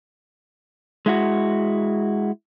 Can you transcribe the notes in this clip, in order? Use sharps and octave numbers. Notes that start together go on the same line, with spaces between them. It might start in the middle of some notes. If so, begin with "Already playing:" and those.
G#3 E4 F#4